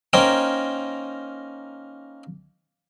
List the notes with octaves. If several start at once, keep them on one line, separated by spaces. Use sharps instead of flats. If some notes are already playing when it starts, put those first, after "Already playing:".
A#3 C#4 D#4 A#4 C5 G5